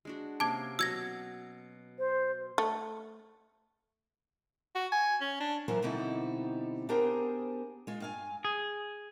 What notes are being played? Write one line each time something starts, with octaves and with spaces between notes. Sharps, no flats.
G#3 D4 F#4
C3 A#3 C#4 A5 D6 G#6
B2 F#3 C#6 E6 G#6 A#6
C5
A3
F#4
G#5
C#4
D4
E3 F#3 C#4 F4 A#4 C5
B2 D3 G3 C4 D#4 E4
B3 D4 G4 G#4 A#4 C5
G#3 F4
G2 F5 G#5
G#4